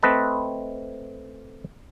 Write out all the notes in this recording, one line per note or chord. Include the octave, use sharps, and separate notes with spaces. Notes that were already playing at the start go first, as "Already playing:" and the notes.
A3 C4 B4 D#5 A5